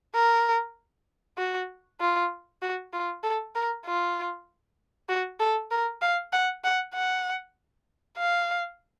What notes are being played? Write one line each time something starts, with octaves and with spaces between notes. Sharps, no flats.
A#4
F#4
F4
F#4
F4
A4
A#4
F4
F#4
A4
A#4
F5
F#5
F#5
F#5
F5